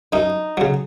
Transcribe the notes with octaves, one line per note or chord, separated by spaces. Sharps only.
F#2 D#4
C#3 F#3